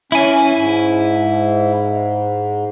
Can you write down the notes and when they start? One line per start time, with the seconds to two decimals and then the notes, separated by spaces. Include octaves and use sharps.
0.12 C#4 E4 G#5
0.55 G#2